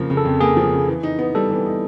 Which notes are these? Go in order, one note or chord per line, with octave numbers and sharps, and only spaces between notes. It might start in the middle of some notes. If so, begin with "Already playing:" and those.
Already playing: F2 C#3 F3 A#3
C#3
A4
F2
A#3 G#4
F3
C#3
E3
D#4
B3
G3 A4
E3
D#4